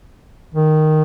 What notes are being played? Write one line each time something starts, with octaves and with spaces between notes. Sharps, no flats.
D#3